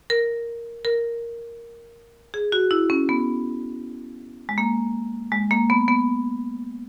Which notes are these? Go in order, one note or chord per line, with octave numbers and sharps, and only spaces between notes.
A#4
A#4
G#4
F#4
E4
C#4
B3
G#3
A#3
G#3
A#3
B3
B3